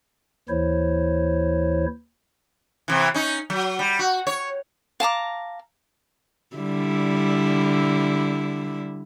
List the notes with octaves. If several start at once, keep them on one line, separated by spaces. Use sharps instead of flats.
D#2 E3 E4 C5 C#5
C3 E3
C#4 D#4
F#3
G3
F#4
C#5
F5 A5 A#5 D6
D3 G3 E4